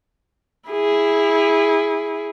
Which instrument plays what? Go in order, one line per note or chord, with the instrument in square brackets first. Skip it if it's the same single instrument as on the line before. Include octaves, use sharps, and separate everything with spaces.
[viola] E4 G#4